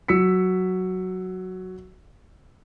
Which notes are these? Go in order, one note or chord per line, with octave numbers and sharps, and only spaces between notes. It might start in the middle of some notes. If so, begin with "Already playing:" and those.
F#3 E6 B6 C#7